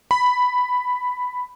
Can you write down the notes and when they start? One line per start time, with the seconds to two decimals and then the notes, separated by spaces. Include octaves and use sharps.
0.11 B5